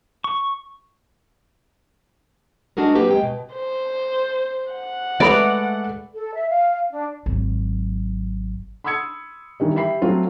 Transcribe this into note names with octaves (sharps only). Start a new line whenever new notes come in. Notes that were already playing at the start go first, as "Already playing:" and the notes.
C#6
G#3 D4 F#4 G#4 A#4
F#3 A#3 C4 G4 B4
G#3 G5
B2
C5
F#5
G#3 A3 B4 D5 E5 B5 D#6
A4
E5
F5
D4
G#1 F#3
B5 C6 D#6 E6 G#6 C#7
D#3 E3 G3
G4 E5 B5 C7
F#3 A3 C4 F4